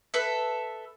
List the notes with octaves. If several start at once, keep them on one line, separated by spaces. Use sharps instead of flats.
A4 B4 E5